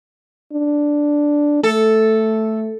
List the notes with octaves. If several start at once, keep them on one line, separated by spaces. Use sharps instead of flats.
D4
A3 A4